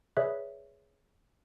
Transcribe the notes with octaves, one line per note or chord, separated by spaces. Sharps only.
G#4 B4 C#5 D5 E5 F#6